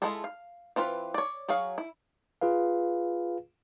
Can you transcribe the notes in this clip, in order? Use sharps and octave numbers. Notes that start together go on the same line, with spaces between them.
G#3 E4 F4 G#4 A4
F5
E3 C4 F4 B4
C#5 D5
F#3 G#4 C#5 F5
E4
F4 G#4 B4 F5